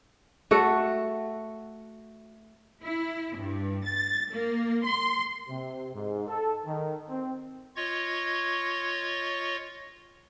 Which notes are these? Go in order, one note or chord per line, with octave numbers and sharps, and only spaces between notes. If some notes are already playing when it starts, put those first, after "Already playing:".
A3 F#4 A4
E4
G2
A6
A#3
C6
C3
G#2
A4
D#3
C4
F4 C#5 D#5 C#6 G#6